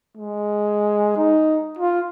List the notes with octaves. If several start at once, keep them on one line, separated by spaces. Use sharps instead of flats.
G#3
D#4
F4